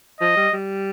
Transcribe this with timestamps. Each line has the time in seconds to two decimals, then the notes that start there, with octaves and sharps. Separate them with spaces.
0.20 F3 D#5
0.36 G3
0.53 G3